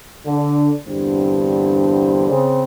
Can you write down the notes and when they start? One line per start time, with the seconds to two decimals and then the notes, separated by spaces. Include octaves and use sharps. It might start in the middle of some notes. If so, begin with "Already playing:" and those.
0.25 D3
0.85 E2 G2 D3 C4
2.28 C#3 C4